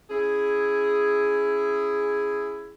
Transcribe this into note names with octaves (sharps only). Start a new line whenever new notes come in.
C#4 E4 G#4